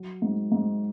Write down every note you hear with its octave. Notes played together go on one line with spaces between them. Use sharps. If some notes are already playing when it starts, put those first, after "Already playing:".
Already playing: F#3
G#2
G#2